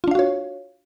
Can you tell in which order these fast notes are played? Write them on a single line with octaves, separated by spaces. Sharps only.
F4 D4 F5 F#4 C#5